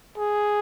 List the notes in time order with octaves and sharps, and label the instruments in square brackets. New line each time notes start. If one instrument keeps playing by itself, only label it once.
[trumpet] G#4